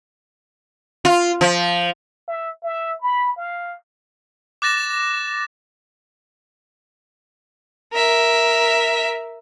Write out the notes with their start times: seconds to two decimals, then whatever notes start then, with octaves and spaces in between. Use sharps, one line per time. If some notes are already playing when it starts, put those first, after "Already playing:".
1.05 F4
1.41 F3
2.28 E5
2.63 E5
3.01 B5
3.37 F5
4.62 D6 F#6 A6 A#6 E7
7.94 A#4 E5